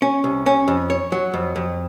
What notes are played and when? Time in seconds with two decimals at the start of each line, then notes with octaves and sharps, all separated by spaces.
0.02 C#4
0.24 C2
0.46 C#4
0.68 F2
0.90 C#5
1.12 F#3
1.34 F2
1.56 F2